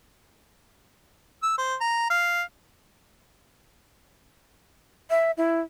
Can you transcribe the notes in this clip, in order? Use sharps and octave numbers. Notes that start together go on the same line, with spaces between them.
E6
C5
A#5
F5
E5
E4